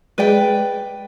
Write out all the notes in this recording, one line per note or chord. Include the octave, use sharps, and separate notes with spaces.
G#3 B4 D5 G5